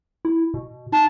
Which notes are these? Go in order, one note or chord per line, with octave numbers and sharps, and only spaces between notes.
E4
B2
D#4 A5